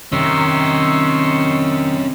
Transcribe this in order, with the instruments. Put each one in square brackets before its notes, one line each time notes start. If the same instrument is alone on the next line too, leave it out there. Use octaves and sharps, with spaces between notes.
[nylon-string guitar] C3 [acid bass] D#3 [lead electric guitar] C#4 A#4 [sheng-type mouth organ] C6 C#6 E6